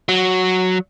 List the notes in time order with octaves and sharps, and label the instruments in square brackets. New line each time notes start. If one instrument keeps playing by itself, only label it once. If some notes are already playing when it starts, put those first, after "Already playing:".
[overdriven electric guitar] F#3